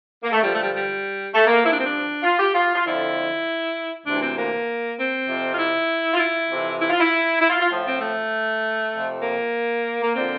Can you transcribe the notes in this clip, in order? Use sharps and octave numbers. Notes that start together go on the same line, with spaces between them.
A#3
A3
G2 D3 F3 G3
A3
G3
G3
A3
A#3
G2 F3 D4 E4
C4
D4
F4
G4
F4
F4
F2 D3 F3 E4
D2 C3 E3 D4
C4
A#3
C4
F2 C3 F3
F4
E4
F4
E4
F2 C3 E3
E4
F4
E4
E4
F4
F4
A2 F3
C4
A3
F2 C3 F3
A#3
A#3
D3 F3 C4